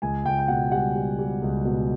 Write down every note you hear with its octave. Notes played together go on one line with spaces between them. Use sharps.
C#2 G#5
C#2 G5
G5
B2 F#5
G3 F#5
G3
G3
C#2
B2